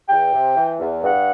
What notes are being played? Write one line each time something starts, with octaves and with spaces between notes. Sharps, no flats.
E2 G5
C3
E3
E2
G2 F#5